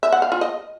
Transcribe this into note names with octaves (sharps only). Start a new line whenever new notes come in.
E5
F#5
F5
F4
D#5